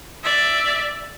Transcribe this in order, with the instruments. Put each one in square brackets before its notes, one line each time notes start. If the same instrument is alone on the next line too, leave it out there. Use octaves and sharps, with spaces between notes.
[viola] D5 E5